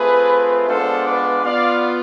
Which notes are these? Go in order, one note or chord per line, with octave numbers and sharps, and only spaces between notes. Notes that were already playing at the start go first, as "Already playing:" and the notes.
Already playing: A3 C4 F4 G#4 B4
G#3 B3 D4 F4 A4 C5
B4 D5
B3 F4 D5 F5